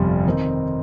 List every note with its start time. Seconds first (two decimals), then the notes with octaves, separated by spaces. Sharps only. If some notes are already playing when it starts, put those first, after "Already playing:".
Already playing: G1 F2 C3 G3
0.26 D#3 C4 D#4